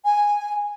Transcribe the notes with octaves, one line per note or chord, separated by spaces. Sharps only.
G#5